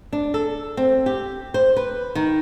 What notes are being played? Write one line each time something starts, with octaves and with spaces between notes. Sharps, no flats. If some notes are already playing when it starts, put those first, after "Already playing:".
D4
A4
C4
G4
C5
B4
D#3